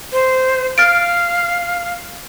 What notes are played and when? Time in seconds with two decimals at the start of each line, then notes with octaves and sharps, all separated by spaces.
0.13 C5
0.78 F5 F6 A6 D7